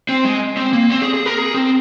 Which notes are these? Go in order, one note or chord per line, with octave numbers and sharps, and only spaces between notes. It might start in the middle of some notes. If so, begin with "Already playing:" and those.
C4
G#3
C4
A#3
C4
G#4
G#4
A#4
G#4
C4